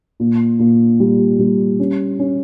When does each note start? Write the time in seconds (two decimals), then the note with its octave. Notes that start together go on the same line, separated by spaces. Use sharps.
0.20 A#2
0.59 A#2
1.00 G3
1.39 G3
1.80 C#4
2.20 C#4